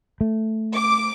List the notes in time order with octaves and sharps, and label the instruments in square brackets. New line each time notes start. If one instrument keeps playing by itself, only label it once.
[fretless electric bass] A3
[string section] D6